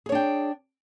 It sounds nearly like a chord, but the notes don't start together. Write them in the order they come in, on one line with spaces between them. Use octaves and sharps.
G#4 C#5 D4 G5